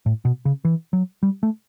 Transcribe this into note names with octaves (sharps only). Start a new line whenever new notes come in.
A2
B2
C#3
E3
F#3
G3
A3